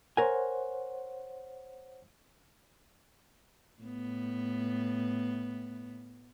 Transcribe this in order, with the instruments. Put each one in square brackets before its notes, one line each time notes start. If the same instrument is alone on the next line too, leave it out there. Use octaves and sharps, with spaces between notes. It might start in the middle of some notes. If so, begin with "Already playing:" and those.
[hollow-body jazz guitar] A#4 G#5 [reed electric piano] C5 C#5 F#5
[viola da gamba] A2 B3